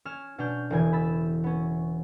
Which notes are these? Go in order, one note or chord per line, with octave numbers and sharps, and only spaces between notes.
C#4 F6 G#6 E7
B2 C#4 D4 F6 G6
E1 C#3 E3 G#5 G#6
B5 E6 A6
B3 C#4